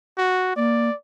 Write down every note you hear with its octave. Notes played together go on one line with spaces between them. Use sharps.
F#4
A#3 D5